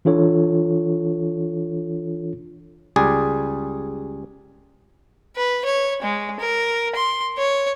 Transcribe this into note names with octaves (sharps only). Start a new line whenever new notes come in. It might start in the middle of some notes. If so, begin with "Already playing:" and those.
E3 D4 F4 A4 C#5
C#2 G3 G#4 D5
B4
C#5
G#3
A#4
C6
C#5